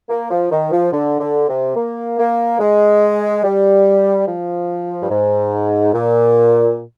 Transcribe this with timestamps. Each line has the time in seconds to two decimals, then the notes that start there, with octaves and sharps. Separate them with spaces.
0.09 A#3
0.31 F3
0.51 D#3
0.71 F3
0.92 D3
1.20 D3
1.48 C3
1.75 A#3
2.18 A#3
2.60 G#3
3.44 G3
4.27 F3
5.02 G2
5.10 G#2
5.93 A#2